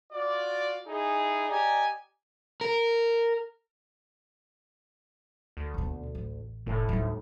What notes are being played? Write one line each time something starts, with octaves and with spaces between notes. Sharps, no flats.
F4 F#4 D5
D#4 E4 G#4
G4 D5 D#5 G#5 A#5
A#4
D2
D#2 B2
A1
F1 A2
D2 G3 D#4